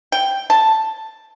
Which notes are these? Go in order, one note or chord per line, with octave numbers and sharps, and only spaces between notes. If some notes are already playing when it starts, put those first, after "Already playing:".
G5
A5